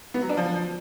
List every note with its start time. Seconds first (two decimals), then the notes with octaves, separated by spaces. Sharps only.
0.14 B3
0.22 F#3
0.29 D4
0.37 F3